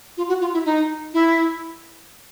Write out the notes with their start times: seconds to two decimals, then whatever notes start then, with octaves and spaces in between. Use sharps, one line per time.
0.17 F4
0.28 F#4
0.41 F4
0.53 E4
0.65 D#4
1.13 E4